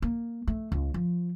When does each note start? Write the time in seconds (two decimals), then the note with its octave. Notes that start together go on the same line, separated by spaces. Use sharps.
0.02 A#3
0.47 A3
0.72 C#2
0.94 F3